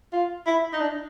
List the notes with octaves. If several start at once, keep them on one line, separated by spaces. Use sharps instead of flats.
F4
E4
D#4
D4